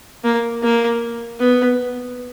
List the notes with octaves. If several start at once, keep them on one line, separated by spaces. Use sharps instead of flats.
A#3
A#3
B3